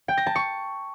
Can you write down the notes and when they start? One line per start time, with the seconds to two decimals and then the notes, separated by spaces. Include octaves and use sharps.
0.08 G5
0.17 A#6
0.26 A5
0.35 C#6